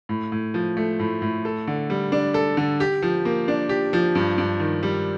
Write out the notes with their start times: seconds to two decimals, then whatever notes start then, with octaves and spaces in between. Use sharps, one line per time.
0.09 A2
0.32 A2
0.54 F3
0.77 A3
0.99 A2
1.22 A2
1.45 A4
1.67 D3
1.90 G3
2.12 D4
2.34 A4
2.57 D3
2.80 G4
3.02 F3
3.25 A#3
3.48 D4
3.69 G4
3.93 F3
4.15 G2
4.38 G2
4.60 D#3
4.83 G3